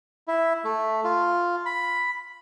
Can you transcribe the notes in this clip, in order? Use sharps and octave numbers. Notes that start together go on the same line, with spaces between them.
E4
A3
F4
B5